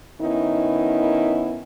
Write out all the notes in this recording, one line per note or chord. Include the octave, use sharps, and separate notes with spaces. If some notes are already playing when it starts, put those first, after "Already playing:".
D#3 B3 C#4 D#4 E4